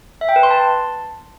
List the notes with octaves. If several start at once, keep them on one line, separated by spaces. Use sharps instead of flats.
E5
G5
B4
C6
A5